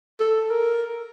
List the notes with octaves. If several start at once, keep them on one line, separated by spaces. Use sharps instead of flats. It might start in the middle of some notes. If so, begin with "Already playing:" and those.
A4
A#4